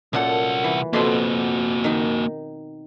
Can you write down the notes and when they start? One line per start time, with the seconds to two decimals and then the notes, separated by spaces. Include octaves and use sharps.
0.13 C2 F#2 A#2 A4 F#5
0.64 E3
0.93 F2 B2 A#3 F#4 C6
1.84 D#3 D#4